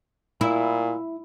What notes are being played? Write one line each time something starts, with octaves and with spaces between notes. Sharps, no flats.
A#2 E4